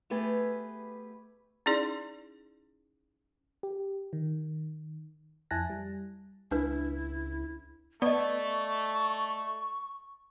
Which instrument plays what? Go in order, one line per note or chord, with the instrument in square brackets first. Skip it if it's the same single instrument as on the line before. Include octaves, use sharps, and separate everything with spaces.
[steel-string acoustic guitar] A3 B3 G4 G#4 B4
[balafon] C#4 D#4 E4 G#4 D5
[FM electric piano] G4
D#3
F2 E4 G#5 A5 F#6 A#6
G3
[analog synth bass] C#2 [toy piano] D4 B4 [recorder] E4
[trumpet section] A3 [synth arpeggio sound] B3 [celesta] D5 D#5 [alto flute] C#6